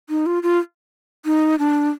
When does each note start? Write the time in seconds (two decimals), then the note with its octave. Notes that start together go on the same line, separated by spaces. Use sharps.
0.10 D#4
0.26 F4
0.43 F4
1.26 D#4
1.59 D4